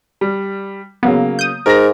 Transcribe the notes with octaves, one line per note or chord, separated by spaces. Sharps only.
G3
C#3 F#3 A#3 B3
D#6 G6
G#2 A#4 A#6